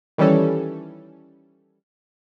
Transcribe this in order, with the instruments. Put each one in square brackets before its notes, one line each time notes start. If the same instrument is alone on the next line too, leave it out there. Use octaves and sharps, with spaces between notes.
[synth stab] D#3 E3 G3 C#4 A4